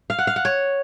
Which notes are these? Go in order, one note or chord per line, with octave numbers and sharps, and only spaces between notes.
F5
F#5
F5
F#5
C#5